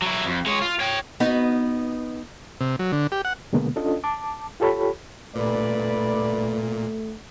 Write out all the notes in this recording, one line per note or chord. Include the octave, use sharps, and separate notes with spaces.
F#3 E4
F2
G#3 C#5
F4
C#5 G5
B3 D#4 F#4
C3
F#3
D3
G4
F#5
B2 D3 G#3 A#3 B3
C#4 D4 F4 A4 D#5
A5 D6
F4 G4 A4 C#5 B5
G2 A#2 A3 B4 D5